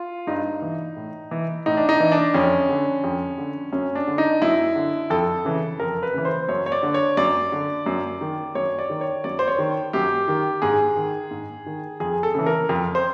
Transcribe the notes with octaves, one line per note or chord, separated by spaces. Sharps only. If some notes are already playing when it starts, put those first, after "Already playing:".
Already playing: F4
G2 D#4
E3
A2
E3
A2 D#4
D4
D#4
E3
D4
F2 C#4
D3
F2
D3
F#2 C#4
D4
D3
D#4
F#2 E4
D3
F2 A4
C#3 E3
F2 A#4
B4
C#3 E3
C5
F#2 C#5
C#5
D5
D3
C#5
F#2 D5
D3
F#2
D#3
F#2 C#5
D5
D#3
C#5
F#2 D5
C5
C#5
D#3
F#2 G4
D#3
G#2 G#4
D#3
G#2
D#3
F2 G#4
A4
C#3 E3
A#4
F2
C5